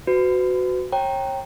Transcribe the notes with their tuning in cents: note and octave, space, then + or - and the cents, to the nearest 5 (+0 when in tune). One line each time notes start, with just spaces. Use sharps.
F#4 +0 B4 +35
C#5 -35 G5 +0 A#5 +0